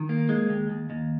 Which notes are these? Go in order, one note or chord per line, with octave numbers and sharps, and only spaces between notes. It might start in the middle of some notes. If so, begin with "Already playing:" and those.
Already playing: D#3
A#3
G#3
D#2
D#2
D#2